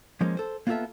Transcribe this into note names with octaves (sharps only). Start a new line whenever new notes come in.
F3 G#3 A#3 C#4
A4 C5
A#3 B3 F4 F#4 A4 E5